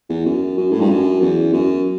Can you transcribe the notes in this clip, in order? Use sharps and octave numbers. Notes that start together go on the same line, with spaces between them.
E2
F#2
F#2
A2
G2
F#2
E2
F#2